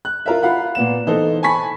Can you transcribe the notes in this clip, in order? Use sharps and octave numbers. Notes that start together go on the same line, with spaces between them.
F#6
F4 A#4 E5
F4 F5 F#5 B5
A#2 B3 E7
E3 D#4 A4 C5
G#5 A5 B5 C#6 B6